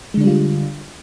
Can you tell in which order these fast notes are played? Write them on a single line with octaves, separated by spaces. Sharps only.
G#3 D3 D4 G3 F4